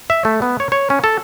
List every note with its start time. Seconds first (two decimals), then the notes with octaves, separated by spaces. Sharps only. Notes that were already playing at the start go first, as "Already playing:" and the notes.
0.10 E5
0.25 A3
0.42 B3
0.60 C#5
0.72 C#5
0.90 C#4
1.04 A4